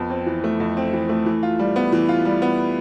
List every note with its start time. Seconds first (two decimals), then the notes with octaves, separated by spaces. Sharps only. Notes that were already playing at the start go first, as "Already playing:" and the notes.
Already playing: F2 B3
0.10 C4
0.26 E3
0.44 A3
0.60 F2
0.77 C4
0.93 E3
1.09 A3
1.26 E3
1.43 F4
1.59 G3
1.76 B3
1.92 E3
2.09 F4
2.25 G3
2.42 B3